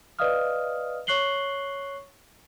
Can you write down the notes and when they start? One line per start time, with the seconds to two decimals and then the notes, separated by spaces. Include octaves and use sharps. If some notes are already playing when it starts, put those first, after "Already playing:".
0.19 B4 D5 D#5 F5 D#6 F6
1.07 C#5 C#6 F#6 C7 F#7 G7